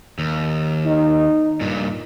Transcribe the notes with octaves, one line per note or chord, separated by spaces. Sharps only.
D#2
D#4
G2 A#2